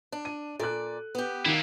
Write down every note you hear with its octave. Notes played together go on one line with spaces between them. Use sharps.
D4
D#7
A#2 A4 D5 F#6
B3 G4
D#3 A#3 E4